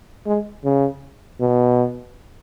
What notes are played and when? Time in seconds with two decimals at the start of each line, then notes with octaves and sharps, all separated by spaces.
0.26 G#3
0.64 C#3
1.40 B2